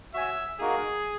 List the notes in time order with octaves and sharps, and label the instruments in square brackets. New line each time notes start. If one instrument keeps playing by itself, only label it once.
[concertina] F#4 C#5 G#5 [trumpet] E5
[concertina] A#3 D#4 F#4 A#4 [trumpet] G#4